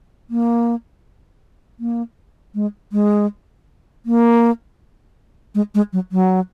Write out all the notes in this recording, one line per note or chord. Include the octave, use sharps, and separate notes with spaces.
A#3
A#3
G#3
G#3
A#3
G#3
G#3
F#3
F#3